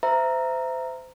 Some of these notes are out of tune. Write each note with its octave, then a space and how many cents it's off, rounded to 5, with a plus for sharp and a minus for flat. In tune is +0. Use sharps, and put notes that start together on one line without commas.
C5 -30 E5 +10 A#5 +0